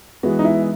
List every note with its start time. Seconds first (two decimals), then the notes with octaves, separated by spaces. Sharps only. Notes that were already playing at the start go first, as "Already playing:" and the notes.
0.23 E3 G#3 B3 F#4
0.39 D#4
0.44 E4